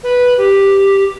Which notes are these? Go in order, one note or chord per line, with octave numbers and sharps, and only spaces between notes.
B4
G4